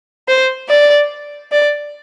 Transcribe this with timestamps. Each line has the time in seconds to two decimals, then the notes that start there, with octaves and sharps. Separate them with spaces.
0.28 C5
0.69 D5
1.52 D5